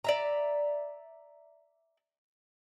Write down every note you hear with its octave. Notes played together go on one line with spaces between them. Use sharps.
D5 E5 A#5